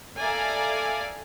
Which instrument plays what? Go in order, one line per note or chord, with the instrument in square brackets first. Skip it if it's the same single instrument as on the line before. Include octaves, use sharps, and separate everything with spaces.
[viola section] A4 D5 E5 F5 G#5 A#5